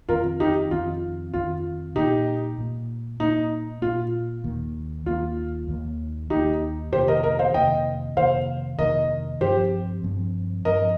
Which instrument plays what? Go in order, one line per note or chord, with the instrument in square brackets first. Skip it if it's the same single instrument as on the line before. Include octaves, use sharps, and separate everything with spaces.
[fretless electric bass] F2 D#3 C4 [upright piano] F4 A#4
[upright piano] D#4 G4
[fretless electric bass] F2 D#3 C4 [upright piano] F4
[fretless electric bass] F2 D#3 C4 [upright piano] F4
[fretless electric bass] A#2 A#3 [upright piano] D#4 G4
[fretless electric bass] A#2 A#3
[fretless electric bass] A#2 A#3 [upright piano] D#4
[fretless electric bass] A#2 A#3 [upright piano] F4
[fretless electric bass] D#2 D#3 A#3
[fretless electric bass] D#2 D#3 A#3 [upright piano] F4
[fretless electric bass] D#2 D#3 A#3
[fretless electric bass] D#2 D#3 A#3 [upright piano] D#4 G4
[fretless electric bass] F2 C3 D#3 A#3 [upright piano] G4 C5
[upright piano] A#4 D#5
A#4 D#5
C5 F5
[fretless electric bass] F2 C3 D#3 A#3 [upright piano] D#5 G5
[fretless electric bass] F2 C3 D#3 A#3 [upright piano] C5 F5
[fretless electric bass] F2 C3 D#3 A#3 [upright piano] A#4 D#5
[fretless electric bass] G2 F3 C4 [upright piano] G4 C5
[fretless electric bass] G2 F3 C4
[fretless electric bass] G2 F3 C4 [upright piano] A#4 D#5